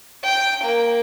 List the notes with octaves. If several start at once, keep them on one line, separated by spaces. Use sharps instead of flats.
G5
A#3